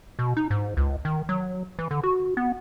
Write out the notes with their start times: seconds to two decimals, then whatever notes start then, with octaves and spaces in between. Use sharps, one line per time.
0.19 B2
0.37 D#4
0.50 G#2
0.77 C#2
1.05 D#3
1.29 F#3
1.79 E3
1.91 D3
2.03 F#4
2.37 B3